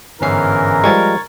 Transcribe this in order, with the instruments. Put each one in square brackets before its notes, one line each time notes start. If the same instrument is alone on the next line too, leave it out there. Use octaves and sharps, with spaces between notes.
[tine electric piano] G1 C#4 C7 [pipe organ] G#2 E3 [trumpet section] A#4
[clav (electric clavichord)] F3 G3 G#3 [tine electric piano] C#6 G#6 A6